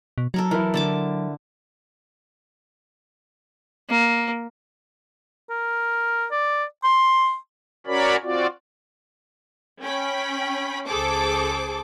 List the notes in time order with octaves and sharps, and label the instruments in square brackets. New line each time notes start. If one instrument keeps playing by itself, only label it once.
[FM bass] B2
[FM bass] F#3 [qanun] A4 A#4 A#5
[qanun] E3 [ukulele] E4 A#4
[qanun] D3 A5 D6
[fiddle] A#3
[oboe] A#4
D5
C6
[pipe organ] C#4 F#4 A#4 C#5 D5 B5
C4 F4 F#4 D5
[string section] C#4 G5 B5
C#2 G#4 A4 C5 D6